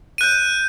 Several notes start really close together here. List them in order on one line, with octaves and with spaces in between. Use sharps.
D#7 F#6 G6